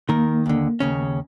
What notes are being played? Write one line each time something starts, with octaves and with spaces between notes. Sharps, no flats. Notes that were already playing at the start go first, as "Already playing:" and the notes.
D#3 A#3 A#4
D#2 D3
D#2 C#3 C#4